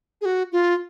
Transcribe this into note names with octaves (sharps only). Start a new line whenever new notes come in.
G#4
F#4
F4